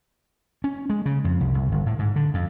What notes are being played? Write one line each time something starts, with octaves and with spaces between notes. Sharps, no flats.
C#4
G#3
C#3
F2
C2
C2
G1
A2
G#2
D3
F2